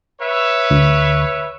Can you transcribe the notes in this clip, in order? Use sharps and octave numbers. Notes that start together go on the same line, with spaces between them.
B4 C#5 E5
D2